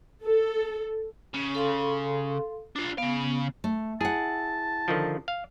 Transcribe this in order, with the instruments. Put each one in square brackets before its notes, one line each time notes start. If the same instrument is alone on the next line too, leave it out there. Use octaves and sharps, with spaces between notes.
[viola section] A4
[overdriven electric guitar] C#3
[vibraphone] A4 F5 C6
[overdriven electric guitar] D4 F4
[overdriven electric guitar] C#3 F5 [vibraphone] B3
[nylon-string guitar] A3
[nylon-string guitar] E4 F#5 [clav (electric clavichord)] G#4 [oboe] A5
[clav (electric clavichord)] D3 D#3 F3
F5